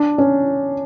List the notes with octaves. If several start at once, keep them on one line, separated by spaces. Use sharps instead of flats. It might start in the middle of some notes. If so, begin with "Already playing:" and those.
Already playing: D4
C#4